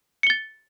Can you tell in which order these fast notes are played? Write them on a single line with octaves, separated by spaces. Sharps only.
C#7 G7 A6